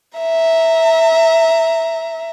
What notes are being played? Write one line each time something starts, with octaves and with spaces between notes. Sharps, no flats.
E5 A#5